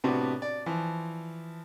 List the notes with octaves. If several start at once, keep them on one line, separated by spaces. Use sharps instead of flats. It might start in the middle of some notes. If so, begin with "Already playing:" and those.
A2 C3 B3 D4 F#4
D5
E3 F3